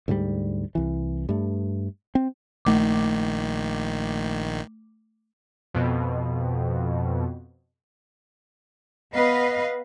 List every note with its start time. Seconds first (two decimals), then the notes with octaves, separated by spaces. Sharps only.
0.08 D2 G#2 F#3 G3
0.75 C2 E3
1.29 G2 A3
2.15 C4
2.65 A#1 D#3 A3 D6
5.74 F2 B2
9.12 B3 B4 D#5 F5